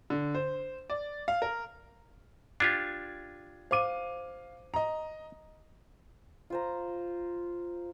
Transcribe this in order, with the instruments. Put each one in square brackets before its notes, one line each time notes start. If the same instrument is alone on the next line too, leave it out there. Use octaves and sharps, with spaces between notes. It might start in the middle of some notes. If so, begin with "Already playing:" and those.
[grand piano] D3
C5
D5
F5
A#4
[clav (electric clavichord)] D4 F4 G4 [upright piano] G#6
[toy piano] C5 D6 [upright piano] F5 D#7
[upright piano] D#5 A#5
[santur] F4 C5 A#5